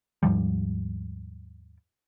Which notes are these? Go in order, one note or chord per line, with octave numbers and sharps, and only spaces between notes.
D#2 G#2 F3 G3